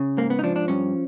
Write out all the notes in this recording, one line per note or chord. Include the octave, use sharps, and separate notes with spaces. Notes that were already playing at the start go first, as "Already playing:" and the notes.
Already playing: C#3
G#2 A#3
B3
D#4
F3 D4
D4
G2 C#4